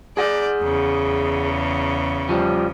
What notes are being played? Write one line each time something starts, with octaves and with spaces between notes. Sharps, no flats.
G#4 D5 F#5
E2 C#3
F3 G3